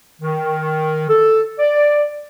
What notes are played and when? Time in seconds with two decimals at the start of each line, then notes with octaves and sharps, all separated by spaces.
0.22 D#3
1.08 A4
1.59 D5